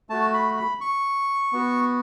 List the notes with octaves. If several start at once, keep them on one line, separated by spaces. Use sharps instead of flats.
A3 F#4 A5
B5
B5
C#6
B3 F#4